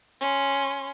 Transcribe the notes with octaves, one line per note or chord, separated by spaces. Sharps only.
C#4 C6